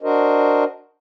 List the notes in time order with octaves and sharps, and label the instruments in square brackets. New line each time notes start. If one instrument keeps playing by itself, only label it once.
[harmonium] D4 F#4 A#4 C5 D#5